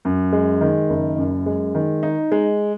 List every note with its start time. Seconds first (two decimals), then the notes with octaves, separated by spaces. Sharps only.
0.05 F#2
0.33 G#3
0.61 D#3
0.90 F#1
1.18 F#2
1.46 G#3
1.75 D#3
2.03 D#4
2.32 G#3